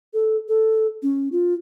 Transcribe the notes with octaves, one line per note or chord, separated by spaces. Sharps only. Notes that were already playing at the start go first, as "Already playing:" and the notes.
A4
A4
C#4
F4